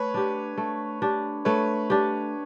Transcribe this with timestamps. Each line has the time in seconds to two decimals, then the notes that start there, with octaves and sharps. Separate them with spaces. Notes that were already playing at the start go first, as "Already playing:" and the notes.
Already playing: A3 B4 C#5
0.14 D4 G4
0.57 A3
1.02 D4 G4
1.45 A3 B4 C#5
1.90 D4 G4